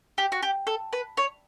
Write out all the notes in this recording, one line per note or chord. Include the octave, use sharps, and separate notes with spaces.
G4
F#4
G4
A4
B4
C#5